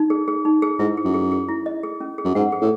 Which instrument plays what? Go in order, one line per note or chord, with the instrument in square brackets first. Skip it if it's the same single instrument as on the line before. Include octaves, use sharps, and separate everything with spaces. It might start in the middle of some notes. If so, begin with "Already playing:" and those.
Already playing: [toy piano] D#4
G#4
G#4
D#4
G#4
[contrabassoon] G#2 [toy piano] E4
[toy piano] G#4
[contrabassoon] F#2
[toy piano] G#4
G#4
E4
D#5
G#4
C#4
G#4
[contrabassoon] F#2
[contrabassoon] G#2 [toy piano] F#5
[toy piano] G#4
[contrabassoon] A2